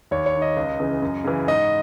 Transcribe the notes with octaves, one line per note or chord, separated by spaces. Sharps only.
D#2 C#5
C#5
D#3
D#5
C#2
C#3 E3
F#2
C#3 E3
G#2 D#5